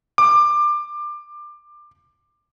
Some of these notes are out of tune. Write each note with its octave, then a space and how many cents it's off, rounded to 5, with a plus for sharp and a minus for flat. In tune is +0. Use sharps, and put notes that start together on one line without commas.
D6 +20